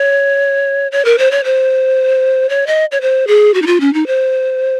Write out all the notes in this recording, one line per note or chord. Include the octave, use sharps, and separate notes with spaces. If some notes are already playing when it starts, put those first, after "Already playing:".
Already playing: C#5
C#5
A#4
C5
C#5
C5
C#5
D#5
C#5
C5
G#4
F#4
D#4
F4
C#4
D#4
C5